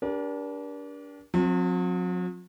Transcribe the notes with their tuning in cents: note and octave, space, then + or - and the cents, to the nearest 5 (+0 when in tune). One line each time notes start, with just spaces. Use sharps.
D4 -25 G4 +10 A#4 +40
F#3 -45 C4 +15